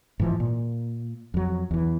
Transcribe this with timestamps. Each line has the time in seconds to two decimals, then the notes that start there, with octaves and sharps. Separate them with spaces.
0.20 G#2 E3 F3
0.40 A#2
1.34 F2 F#3
1.71 E2 E3